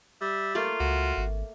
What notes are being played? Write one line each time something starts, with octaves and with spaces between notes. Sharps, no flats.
G3 E5
A3 A#3 F4 D5
C#2 F#4
G#1